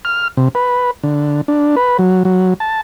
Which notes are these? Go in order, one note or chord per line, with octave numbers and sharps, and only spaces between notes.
F6
C3
B4
D3
D4
B4
F#3
F#3
A5